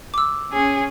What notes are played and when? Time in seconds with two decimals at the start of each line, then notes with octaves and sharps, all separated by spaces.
0.14 D6 E6
0.52 C#4 G#4